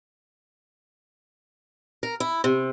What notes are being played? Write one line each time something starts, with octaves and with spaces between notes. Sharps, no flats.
A#4
E4
C3